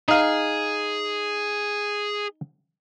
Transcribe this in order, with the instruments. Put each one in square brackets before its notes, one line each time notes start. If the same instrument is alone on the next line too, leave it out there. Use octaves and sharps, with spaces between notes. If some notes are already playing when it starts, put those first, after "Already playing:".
[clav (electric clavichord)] D#4 F5 [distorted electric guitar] G#4